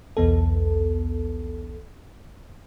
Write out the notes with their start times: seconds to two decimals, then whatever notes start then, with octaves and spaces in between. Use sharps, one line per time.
0.17 B1 E2 B3 A4